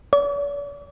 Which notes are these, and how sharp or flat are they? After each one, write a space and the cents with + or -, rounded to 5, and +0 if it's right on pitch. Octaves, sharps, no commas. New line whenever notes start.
D5 -45